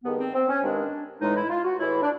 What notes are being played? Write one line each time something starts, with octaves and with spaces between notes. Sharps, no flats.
G2 D#3 G#3 B3
C4
C4
C#4
G2 D#3 G#3 D4
A2 E3 G#3 D#4
E4
F4
F#4
A2 E3 G#3 E4
D4